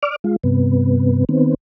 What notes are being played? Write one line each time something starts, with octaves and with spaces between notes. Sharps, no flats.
D5 D6 F6
G#3 F4
G2 C3 B3
D#3 B3 C4